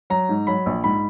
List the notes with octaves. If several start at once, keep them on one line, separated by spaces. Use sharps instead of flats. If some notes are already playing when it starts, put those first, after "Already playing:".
F#3 A#5
G#2
F#3 B5
A#1
G#2 B5